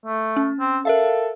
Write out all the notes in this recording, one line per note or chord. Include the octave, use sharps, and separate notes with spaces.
A3
C#4
C4
A4 A#4 E5 F5